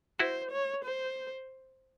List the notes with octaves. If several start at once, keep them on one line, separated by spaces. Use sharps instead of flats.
E4 F#4 C5
C#5
C5